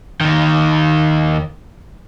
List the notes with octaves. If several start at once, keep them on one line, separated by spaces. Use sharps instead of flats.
D#2 D#3